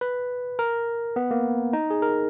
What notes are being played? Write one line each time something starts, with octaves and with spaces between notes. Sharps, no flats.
B4
A#4
B3
A#3
D#4
G#4
A#4